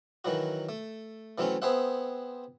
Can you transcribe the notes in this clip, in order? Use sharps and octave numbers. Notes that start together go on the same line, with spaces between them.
D#3 E3 F#3 F#4
A3
E3 F#3 A3 C4 C#4
B3 C4 G#4 C5 E5 F#5